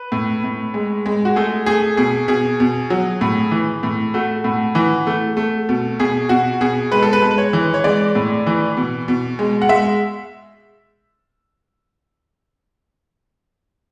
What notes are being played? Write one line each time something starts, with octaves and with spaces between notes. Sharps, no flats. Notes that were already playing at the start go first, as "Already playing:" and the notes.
Already playing: B4
A2
A2
G#3
G#3
F#4
A3 G#4
A3 G#4
B2 G#4
B2 G#4
B2
F#3
A2
E3
A2
A3 F#4
A2
E3
A3
A3
B2
B2 G#4
B2 F#4
B2 G#4
G#3 B4
A4
B4
G#3
B4
C#5
E3
C#5
G#3 D5
A2
E3
B2
B2
G#3
F#5
G#3 E5